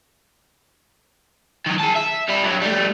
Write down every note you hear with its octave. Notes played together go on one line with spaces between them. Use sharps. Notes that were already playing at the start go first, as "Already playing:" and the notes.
D#3 F#3
G#4 A5
E5
G3 E4
G2 F#3
G3 A3